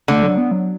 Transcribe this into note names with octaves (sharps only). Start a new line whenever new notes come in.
D3 A3
F#3
B3
F#3